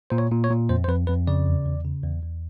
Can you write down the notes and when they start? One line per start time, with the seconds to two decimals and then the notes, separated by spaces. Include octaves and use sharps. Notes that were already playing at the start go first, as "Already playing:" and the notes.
0.10 A#2 C5
0.18 C#5
0.31 A#2
0.44 C#5
0.51 A#2
0.69 F2 C5
0.84 C5
0.88 F2 B4
1.07 F2 B4
1.27 C#3 D5
1.46 E2
1.65 E2
1.85 C#3
2.04 E2
2.23 E2